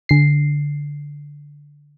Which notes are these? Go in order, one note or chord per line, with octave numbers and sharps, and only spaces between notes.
D3 C7